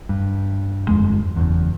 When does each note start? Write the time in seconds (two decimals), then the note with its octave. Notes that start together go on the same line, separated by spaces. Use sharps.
0.09 G2
0.89 G1 F2 G#3
1.36 F#1 E2